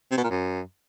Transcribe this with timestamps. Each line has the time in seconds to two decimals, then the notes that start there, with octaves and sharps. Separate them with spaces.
0.11 C3
0.17 B2
0.24 A#2
0.30 F#2